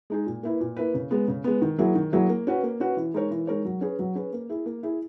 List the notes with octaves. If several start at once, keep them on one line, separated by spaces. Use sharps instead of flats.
G#3 D#4 G#4
A#2
A#3 E4 B4
A#2
A#3 E4 B4
C#3
G#3 B3
C#3
G#3 B3
D#3
F#3 A#3 E4 G#4
D#3
F#3 A#3 E4 G#4
A#3
C#4 F#4 B4
A#3
C#4 F#4 B4
E3
G#3 D#4 A#4 C#5
E3
G#3 D#4 A#4 C#5
F#3
C#4 G#4 B4
F#3
C#4 G#4 B4
A#3
E4 G#4
A#3
E4 G#4